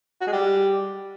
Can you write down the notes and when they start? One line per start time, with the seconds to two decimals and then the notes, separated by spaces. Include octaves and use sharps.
0.21 F#4
0.27 G#3
0.32 G3